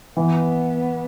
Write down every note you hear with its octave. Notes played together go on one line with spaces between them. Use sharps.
E3 B3